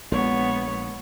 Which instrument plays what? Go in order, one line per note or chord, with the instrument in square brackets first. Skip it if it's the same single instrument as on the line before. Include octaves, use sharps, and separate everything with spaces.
[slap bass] A#1 [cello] G#3 B3 [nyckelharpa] C#5